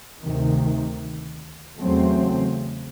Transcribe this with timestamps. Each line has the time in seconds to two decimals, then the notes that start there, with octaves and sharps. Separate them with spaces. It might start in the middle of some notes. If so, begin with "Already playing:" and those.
0.23 D2 C3 D#3
1.81 E2 C#3 F#3 A3 C4